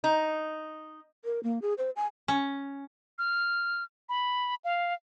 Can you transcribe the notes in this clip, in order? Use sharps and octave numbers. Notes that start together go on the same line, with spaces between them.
D#4
A#4
A#3
G#4
C5
G#5
C#4
F6
B5
F5